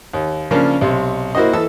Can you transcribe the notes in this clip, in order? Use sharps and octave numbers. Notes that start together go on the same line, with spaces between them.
D#2
C#3 F3 A#3 C#4 D4
B1 C3
A#3 E4 F#4 C5 D#5
E3 A4 E6